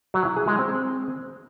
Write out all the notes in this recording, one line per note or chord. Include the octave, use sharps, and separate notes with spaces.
F#3
E4
G#4
G#3
C4